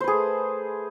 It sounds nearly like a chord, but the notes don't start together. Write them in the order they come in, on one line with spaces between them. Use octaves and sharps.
C5 B4 G#4 A3